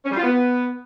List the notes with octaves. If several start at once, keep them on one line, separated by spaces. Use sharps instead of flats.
C#4
G3
F4
B3